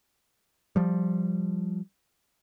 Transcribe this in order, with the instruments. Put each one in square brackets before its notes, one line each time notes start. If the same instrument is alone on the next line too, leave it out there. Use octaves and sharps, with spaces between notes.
[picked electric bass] F3 G3